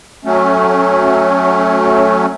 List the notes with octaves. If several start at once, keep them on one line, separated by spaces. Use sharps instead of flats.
F#3 A3 C#4